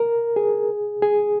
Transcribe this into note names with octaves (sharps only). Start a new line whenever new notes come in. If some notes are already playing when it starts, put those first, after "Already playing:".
Already playing: A#4
G#4
G#4